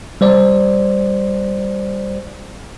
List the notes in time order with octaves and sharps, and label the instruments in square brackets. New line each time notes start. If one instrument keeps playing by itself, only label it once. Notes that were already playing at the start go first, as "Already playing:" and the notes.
[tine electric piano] G3 C5 D5